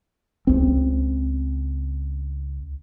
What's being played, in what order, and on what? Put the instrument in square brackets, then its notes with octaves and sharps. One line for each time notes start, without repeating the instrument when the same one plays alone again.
[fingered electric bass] C#2 C4